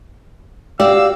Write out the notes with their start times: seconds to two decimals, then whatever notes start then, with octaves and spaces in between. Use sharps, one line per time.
0.80 F#4 G4 D5 F5 E6